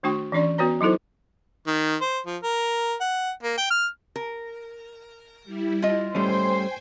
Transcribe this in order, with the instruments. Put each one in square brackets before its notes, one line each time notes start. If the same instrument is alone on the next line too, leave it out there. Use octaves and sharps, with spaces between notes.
[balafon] D#3 A3 D4 F#4 G5 C#6
E3 C#4 D4 D5 C#6
B3 F#4 B4 C#5 A#5
F#3 D#4 E4 A4 C5
[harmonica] D#3
C5
F3
A#4
F#5
A#3
G5
F6
[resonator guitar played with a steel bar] A#4
[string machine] G3 E4
[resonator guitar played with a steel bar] F4 D#5
[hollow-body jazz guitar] G3 A3 C#4 [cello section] C5 [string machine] G5 G#5